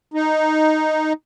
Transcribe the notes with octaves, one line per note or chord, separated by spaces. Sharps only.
D#4